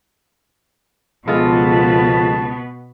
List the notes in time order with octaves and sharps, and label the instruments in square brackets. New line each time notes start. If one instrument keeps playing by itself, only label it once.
[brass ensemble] C#2 A5 [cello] B2 B3 [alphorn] F3 [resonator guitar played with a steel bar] G#3 F4 A4